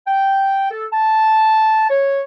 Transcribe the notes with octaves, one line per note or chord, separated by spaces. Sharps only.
G5
A4
A5
C#5